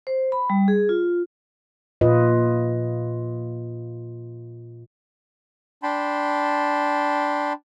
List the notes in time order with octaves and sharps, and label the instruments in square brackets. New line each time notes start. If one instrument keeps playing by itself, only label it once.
[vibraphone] C5
B5
G3
G#4
F4
[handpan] A#2 F4 B4 D#5
[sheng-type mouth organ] D4 G5 A5 B5 C6